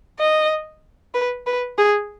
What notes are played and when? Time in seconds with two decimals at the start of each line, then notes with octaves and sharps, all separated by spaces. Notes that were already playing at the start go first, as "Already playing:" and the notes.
0.20 D#5
1.14 B4
1.47 B4
1.78 G#4